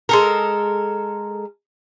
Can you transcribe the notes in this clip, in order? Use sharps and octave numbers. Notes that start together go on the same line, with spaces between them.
G#3 A4 A#4